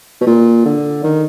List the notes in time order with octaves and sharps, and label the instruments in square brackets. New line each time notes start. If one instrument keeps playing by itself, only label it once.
[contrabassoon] B2
A#2
D3
D#3